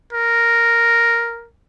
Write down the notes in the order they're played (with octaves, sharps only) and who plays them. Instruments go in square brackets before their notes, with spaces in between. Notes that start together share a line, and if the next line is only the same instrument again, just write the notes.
[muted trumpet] A#4